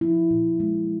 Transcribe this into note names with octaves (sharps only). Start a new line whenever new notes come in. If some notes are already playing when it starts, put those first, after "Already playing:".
F3 E4
A#2
G#3